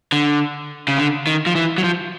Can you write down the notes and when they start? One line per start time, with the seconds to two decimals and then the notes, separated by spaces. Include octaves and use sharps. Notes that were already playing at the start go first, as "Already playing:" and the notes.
0.12 D3
0.88 C#3
0.98 D3
1.27 D#3
1.46 F3
1.55 E3
1.78 F#3
1.84 F3